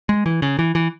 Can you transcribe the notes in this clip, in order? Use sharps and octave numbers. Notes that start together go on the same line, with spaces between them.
G#3
E3
C#3
E3
E3